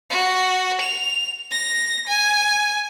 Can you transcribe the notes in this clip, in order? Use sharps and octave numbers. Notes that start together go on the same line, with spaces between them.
F#4
F7
A#6
G#5